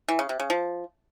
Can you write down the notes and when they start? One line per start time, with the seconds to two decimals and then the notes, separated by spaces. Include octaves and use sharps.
0.08 E3
0.19 C#3
0.29 C3
0.40 C#3
0.50 F3